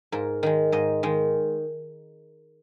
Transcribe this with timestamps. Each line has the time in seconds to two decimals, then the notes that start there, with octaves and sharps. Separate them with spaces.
0.12 G#2 A#4
0.43 D#3 G#3
0.72 G#2 D#5
1.03 D#3 G#3